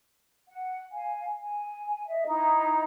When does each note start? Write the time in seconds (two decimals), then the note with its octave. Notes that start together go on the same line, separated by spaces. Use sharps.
0.48 F#5
0.92 F5 G#5
1.40 G#5
2.08 D#5 E5
2.27 D#4 E4